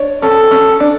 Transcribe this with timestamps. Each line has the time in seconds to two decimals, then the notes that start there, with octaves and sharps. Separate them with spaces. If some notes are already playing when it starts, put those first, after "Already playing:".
Already playing: D4 C#5
0.22 C#4 A4
0.51 C#4
0.80 D4